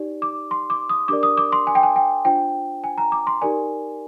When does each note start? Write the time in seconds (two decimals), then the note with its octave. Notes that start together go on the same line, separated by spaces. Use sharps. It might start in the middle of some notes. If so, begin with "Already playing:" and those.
Already playing: D#4 G4 D5
0.22 D6
0.51 C6
0.70 D6
0.89 D#6
1.08 D4 G4 A#4 D5 D6
1.23 D#6
1.37 D6
1.52 C6
1.67 G#5
1.75 G5
1.83 G#5
1.96 G5
2.25 D4 F4 C5 G5
2.84 G#5
2.98 A#5
3.12 D6
3.27 C6
3.42 D#4 G4 A#4 D5 G#5